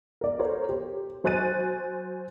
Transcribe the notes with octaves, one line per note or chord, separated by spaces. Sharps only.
A#4 D5
A4 A#4 C5 C#5
G4
F#3 C5 G#5 F#6 A6 D#7